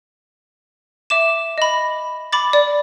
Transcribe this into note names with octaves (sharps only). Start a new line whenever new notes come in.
E5 D6 E7
D#5 B5
B5 D6 A6
D5